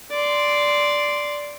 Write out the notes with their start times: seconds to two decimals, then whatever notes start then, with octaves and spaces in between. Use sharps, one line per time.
0.11 D5 C6